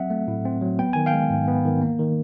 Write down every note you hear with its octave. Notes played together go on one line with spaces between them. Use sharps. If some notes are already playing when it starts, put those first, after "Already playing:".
Already playing: F#3 C4 E5 F#5
A3
A2
C4
F#3
B3 G5
D#3 G#5
F5 G5
G#3
G#2
B3
D#3
A#3
D#3